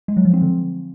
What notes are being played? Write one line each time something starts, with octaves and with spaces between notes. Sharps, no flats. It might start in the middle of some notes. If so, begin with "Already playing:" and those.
G#3
F#3
F3
C4
D3